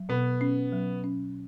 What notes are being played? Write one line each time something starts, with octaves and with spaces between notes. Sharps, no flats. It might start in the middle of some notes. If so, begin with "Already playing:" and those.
Already playing: F#3
B2 B3
C#4
F#3
C#4